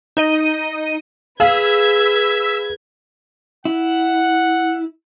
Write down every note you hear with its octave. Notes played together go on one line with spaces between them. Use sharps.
D#4 D#5 D#7
G#4 B4 F5 E6 G#6 B6
E4 F#5